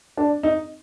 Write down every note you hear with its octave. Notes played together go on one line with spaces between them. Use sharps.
D4
D#4